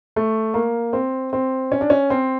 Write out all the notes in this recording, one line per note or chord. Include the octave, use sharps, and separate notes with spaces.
A3
A#3
C4
C4
C#4
D4
C#4
C4